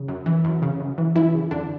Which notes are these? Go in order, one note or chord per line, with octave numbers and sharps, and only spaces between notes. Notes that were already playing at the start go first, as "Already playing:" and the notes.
Already playing: C#3
F#2
E3
F#2
C#3
F#2
E3
F#2 E3 E4
C#3
F#2 D3 D4